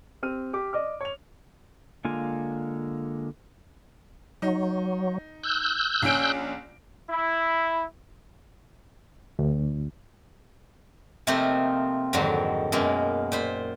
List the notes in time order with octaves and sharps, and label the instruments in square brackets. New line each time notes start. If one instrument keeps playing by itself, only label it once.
[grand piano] C4 G4 F6 D#7
G4 D6
D5 D#5 D6 F6
C#5 F7
[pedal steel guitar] D3 G#3 A#3 F4 G#5
[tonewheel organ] F#3 [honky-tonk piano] D#4
[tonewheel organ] E6 F#6 G6
[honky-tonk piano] A#1 C#4 D7
[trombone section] E4
[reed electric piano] D2
[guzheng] C3 F3 A3 A#3 C4 D#4
F2 G#2 D3 D#3 F#3
F#2 B2 G#3 A#3
A#2 C5 B5